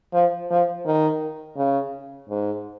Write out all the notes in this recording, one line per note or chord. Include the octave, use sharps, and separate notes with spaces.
F3
F3
D#3
C#3
G#2